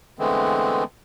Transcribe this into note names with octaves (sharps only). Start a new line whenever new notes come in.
D3 E3 G#3 A3 B3 C4